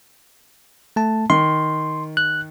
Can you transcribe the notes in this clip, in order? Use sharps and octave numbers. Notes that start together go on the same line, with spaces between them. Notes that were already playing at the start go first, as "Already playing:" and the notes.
A3 A5
D#3 C6
F#6